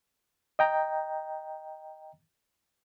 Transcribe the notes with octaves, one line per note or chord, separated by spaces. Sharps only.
D#5 G5 A#5